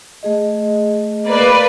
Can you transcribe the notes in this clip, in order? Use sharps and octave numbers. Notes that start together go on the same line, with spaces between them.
A3 G#4 D#5
A#3 B4 D5